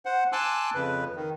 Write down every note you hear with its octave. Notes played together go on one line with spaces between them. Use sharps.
C5 F#5
G#5 A5 C6 D6 E6 F#6
F2 C#3 B4
D#3